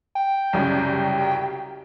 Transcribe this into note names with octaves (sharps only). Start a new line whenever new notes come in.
G5
C2 F#2 C#3